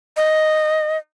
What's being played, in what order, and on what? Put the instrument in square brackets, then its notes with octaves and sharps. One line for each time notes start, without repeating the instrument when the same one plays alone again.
[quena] D#5